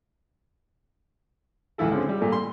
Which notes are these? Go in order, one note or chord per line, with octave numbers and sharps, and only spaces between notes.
C#2 E3 F3 E4 A4
D3 F3 G#3 C4 C#4
G3
A#2 G3 A3
C6